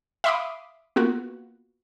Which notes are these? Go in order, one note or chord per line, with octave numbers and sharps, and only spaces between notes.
E5 F5 B5 C6 D6 D#6
A#3 B3 F4 F#4